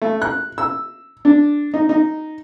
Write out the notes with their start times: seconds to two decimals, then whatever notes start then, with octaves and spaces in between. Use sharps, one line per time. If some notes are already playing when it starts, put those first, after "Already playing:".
0.02 A3
0.22 F#6
0.58 E6
1.25 D4
1.74 D#4
1.89 D#4